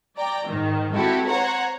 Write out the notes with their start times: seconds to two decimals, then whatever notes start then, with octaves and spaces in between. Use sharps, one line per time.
0.17 D5 G5 A#5
0.47 G#2 D#3
0.94 G#3 C4 E4 F#4 G4 A4
1.27 C5 C#5 F#5 A#5